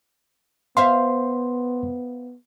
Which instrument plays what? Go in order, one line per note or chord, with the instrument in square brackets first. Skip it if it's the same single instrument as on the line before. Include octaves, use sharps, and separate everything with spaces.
[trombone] B3 [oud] C5 E5 F5 [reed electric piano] C6